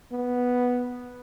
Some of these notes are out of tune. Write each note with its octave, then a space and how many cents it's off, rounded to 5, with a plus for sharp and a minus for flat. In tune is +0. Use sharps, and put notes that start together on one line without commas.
B3 -5